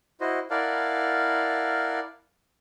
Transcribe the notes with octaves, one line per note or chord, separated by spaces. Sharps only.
E4 F#4 C5 D#5
E4 A#4 D5 F5 F#5 A5